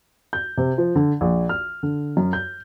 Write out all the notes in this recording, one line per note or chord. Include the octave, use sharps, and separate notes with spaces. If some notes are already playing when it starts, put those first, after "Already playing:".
G6
C3
F3
D3
A#1
F6
D3
F#2
G6